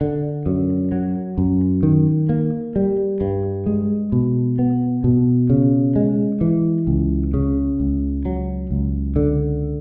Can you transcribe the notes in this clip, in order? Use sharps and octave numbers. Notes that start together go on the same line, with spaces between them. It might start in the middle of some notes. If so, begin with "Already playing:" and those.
D3
F#2
F#3
F#2
D#3
A#3
G3
G2
G#3
B2
B3
B2
C#3
G#3
E3
C#2
C#3
C#2
F#3
C#2
D3